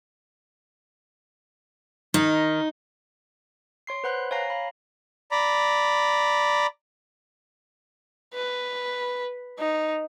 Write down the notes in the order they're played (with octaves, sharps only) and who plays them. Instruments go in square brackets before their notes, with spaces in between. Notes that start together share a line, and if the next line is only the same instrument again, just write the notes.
[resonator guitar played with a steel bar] D#3 [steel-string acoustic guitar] D#4
[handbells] C#5 C6 C7
B4 C5 F#5 B5 F#6
C#5 F5 G#5 A#5 A#6 C7
F5 B5
[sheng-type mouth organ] D5 A#5 B5
[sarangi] B4
D#4